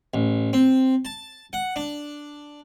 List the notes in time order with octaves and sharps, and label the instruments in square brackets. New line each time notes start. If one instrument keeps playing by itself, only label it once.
[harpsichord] A1
C4
A5
F#5
D4